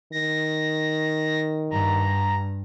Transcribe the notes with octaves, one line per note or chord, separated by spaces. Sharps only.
D#3 A#6
G2 A#5